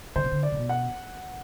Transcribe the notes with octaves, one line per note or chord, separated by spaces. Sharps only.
D3 C5
C3
D3
D5
C3
B2
F#5